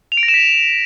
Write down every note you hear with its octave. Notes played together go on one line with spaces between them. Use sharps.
F7
D7
A#6
E7
B6